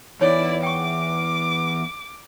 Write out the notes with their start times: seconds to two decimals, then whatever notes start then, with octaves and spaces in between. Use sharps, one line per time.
0.21 E2 D#4 E4 C#5 D5
0.63 G5 C#6 D6